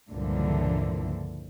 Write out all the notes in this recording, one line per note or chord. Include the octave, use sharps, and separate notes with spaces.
C#2 G2 A#2 D3 E3 F3